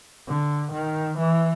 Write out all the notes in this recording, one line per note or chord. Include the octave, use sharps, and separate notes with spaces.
D3
D#3
E3